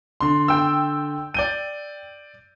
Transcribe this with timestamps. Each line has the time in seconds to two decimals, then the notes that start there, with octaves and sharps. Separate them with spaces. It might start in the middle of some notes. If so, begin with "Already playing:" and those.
0.20 D3 C6
0.48 G5 E6
1.34 D5 G6 D#7